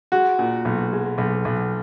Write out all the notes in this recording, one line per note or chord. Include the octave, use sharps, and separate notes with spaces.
G#3 F#4
A#2
B1
G#3
B1
B1